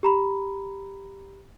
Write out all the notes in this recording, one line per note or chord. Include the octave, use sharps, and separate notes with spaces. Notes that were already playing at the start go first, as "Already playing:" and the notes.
G4 A#5 B5